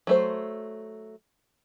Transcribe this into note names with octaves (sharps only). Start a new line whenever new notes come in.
F#3 A3 C5